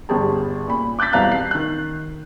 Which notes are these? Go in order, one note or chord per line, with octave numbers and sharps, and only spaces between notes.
G1 G2 G4 G#4 A5
A#2 B5
D6 F#6 G6 A6 B6
E1 C2 F5 A#5 F#6 A6
C7
D#3 F#6